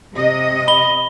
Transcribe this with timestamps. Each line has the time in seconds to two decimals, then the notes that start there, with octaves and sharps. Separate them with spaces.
0.14 C3 D#5
0.68 B5 G7